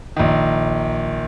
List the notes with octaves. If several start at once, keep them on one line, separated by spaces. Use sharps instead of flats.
A#1 D#3